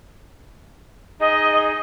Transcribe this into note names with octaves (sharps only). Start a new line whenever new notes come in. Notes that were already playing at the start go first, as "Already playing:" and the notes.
D#4 G#4 D#5